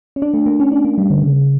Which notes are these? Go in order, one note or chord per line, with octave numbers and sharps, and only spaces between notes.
C#4
D4
A3
A#3
C#4
D4
A#3
G3
D3
C#3